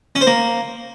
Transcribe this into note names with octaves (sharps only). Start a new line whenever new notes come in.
C#4
C5
A#3